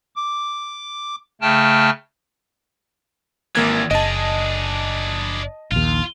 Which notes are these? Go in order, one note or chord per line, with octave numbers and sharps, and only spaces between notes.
D6
C#3 A3 G5 A5 F6
G#1 E3 G3 A#3 G#6
F#1 D4 G#4 D#5 A5
A#1 D#2 F4